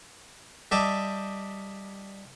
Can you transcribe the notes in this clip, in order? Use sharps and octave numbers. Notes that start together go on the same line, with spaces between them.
G3 G4 D#5 E5 A5